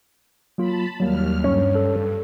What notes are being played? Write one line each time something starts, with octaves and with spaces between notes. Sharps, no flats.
F#3 A#3 F4 A5 B5
D#2 F#3 G3 A#3 F6
G2 C#4
A4